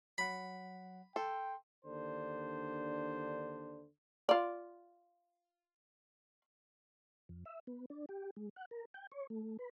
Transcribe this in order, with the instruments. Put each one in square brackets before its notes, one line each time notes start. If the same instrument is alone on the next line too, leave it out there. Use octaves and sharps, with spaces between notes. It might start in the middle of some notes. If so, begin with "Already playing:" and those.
[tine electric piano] F#3 F#5 [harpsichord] B5
[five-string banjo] A4 [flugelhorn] G5 [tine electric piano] C6
[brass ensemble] D#2 D3 D4 C5
[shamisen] F4 D5
[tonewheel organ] F2
E5
B3
D4
G4
G#3
F#5
A#4
G5
C#5
A3
B4